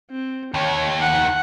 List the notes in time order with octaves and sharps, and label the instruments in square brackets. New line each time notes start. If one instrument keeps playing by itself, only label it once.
[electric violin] C4
[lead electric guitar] D#2 D#3 [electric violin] C#5
[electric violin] F#5